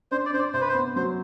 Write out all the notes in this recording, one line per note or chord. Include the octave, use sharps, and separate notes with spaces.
D4 C5
D5
D4 C5
D5
C3 C5
B4
C5
B3
F#3 C5